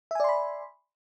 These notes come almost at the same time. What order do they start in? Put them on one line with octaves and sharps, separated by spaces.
E5 G#5 D5 C6 B5